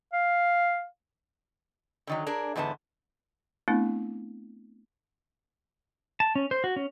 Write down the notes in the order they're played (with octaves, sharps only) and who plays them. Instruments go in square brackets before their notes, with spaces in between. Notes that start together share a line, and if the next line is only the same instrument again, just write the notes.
[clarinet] F5
[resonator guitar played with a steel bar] D3 D#3 F#3
D4 G#4 A#4
E2 G#2 D3 B3 A5
[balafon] A3 B3 C4 D4 E4
[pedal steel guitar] A5
C#4
C5
F#4
C#4